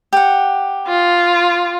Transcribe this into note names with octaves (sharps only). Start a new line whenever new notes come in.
G4 F#5
F4